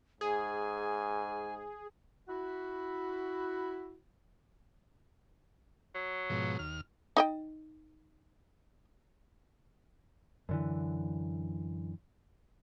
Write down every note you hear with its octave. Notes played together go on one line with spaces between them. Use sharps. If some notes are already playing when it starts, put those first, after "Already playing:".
G#2 G#4 G#5
E4 F#4
F#3
G#2 B2 F3
D#2 F6
D#4 D#5 G5
F#2 D3 E3